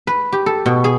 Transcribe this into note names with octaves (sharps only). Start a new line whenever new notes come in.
B4
G4
A4
B2
G#4